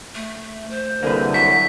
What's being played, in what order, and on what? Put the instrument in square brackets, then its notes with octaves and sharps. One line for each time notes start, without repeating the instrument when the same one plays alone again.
[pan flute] A3
C5
[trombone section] C2 D3 [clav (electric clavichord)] A#3 G#4 B4
[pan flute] F#3 [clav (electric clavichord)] F#4 [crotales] B6